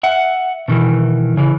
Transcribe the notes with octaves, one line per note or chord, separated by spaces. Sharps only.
E5 F#5
B2 D#3 E3
C#3 E3